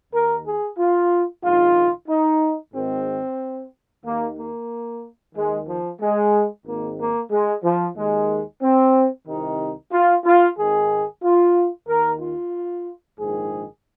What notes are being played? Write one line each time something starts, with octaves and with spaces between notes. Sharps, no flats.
D#2 D#3 A#4
G#4
F4
A#1 G#2 D#3 F4
D#4
G#1 G#2 D#3 C4
D#2 D#3 A#3
A#3
D#2 D#3 G#3
F3
G#3
G#1 G#2 D#3 A#3
A#3
G#3
F3
D#2 D#3 G#3
C4
C2 C3 D#3 D#4
F4
F4
G#1 G#2 D#3 G#4
F4
D#2 D#3 A#4
F4
A#1 G#2 D#3 G#4